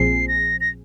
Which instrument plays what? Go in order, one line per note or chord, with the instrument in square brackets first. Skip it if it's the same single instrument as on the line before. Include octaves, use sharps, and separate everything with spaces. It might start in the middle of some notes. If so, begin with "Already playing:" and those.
Already playing: [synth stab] A#1 A#2 F3 C4 G#4 [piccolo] C7
[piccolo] A#6
A#6